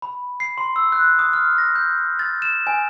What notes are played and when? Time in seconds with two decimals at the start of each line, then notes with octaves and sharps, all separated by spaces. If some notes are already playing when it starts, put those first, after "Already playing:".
0.02 B5
0.40 C7
0.58 C6
0.76 E6
0.92 F#6
1.19 D#6
1.33 F6
1.58 A#6
1.75 G6
2.19 A6
2.42 E7
2.67 G#5